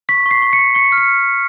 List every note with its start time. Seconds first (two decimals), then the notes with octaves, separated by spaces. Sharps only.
0.09 C#6 B6
0.26 C#6
0.31 C7
0.42 C#6
0.53 C#7
0.59 C#6
0.75 C#6 C#7
0.92 F6
0.98 C#7